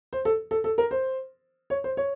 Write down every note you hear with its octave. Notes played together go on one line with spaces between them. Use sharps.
C5
A4
A4
A4
A#4
C5
C#5
C5
C#5